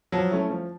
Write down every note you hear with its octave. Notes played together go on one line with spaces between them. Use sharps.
F3 F#3
A3 C#4 E4
F3